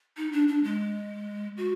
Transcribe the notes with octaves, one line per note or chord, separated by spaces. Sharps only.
D#4
D4
D4
G#3
F#4